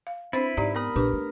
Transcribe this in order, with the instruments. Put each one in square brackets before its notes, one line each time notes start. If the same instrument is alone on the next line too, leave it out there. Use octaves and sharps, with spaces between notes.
[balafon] F5
[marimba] C4 A6 [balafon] D4 C5 [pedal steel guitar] E4 B4
[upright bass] G#2 [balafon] D#4 G4 A#5 [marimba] D5
[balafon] B3 [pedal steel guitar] A#4 B5 D#6
[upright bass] A#1 A#2 [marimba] D4 G4 B4
[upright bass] A3